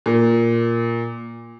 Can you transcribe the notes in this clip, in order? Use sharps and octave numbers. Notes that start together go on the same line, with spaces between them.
A#2